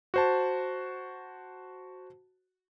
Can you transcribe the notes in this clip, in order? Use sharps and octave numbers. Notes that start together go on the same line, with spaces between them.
F#4 C5 A5